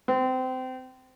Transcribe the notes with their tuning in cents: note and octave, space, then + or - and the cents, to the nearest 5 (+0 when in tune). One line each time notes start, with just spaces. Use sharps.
C4 -25